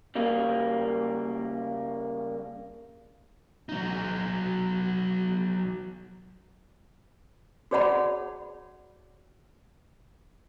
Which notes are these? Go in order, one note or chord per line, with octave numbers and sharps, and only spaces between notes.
C#3 G3 A#3
F#3 D#4
F#4 G#4 C#5 D5 F#5 B5